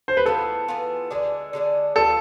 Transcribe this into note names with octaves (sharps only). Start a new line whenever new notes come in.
C5
B4
E3 B3 F4 G#4 A4
E3 B3 F4 G#4
D3 G#3 D4 G#4
D3 G#3 D4 G#4
D3 F3 B3 F4 A4